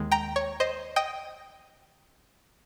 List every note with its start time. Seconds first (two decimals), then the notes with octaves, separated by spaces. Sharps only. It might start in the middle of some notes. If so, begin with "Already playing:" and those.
Already playing: D#2 D#3 G#3
0.11 G5 A#5
0.36 C#5
0.60 C5 D#5
0.96 D#5 G5